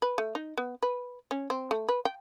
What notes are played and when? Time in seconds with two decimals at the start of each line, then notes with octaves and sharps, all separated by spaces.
0.02 B4
0.18 A3
0.35 D#4
0.58 B3
0.83 B4
1.31 C#4
1.50 C4
1.71 A3
1.89 B4
2.05 G5